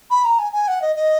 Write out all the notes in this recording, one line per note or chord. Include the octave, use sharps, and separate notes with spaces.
B5
A#5
G#5
G#5
F#5
D#5
D#5